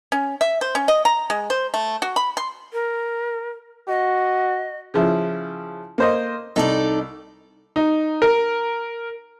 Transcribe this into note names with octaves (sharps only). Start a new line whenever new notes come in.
C#4
E5
C5
C#4
D#5
A#5
G#3
C5
A3
F#4
B5
C6
A#4
F#4 D#5
C#3 F3 E4
A#3 C5 D#5
C2 D#4 A4 D5
D#4
A#4